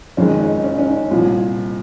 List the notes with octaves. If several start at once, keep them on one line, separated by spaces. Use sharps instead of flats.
F#1 F2 D#3 G#3 C#4
D#4
C#4
C#4
D#4
C2 A#2 F3